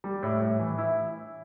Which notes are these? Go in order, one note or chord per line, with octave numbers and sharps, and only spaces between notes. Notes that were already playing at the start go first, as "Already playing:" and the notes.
G3
A2
A2
E3
E4